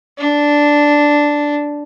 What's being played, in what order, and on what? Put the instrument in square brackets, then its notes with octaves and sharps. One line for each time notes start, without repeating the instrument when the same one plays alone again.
[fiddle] D4